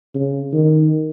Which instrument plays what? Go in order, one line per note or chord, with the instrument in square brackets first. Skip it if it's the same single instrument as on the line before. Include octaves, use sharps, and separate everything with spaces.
[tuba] C#3
D#3